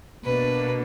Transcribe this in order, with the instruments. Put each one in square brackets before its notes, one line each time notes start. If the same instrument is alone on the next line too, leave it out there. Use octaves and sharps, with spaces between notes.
[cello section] B2 A#3 D4 [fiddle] B4